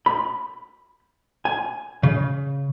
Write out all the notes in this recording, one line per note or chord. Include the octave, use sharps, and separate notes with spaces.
B5
G#5
C#3